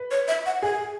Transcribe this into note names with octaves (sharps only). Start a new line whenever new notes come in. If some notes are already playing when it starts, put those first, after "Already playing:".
Already playing: B4
C#5
E5
F#5
G#4 G#5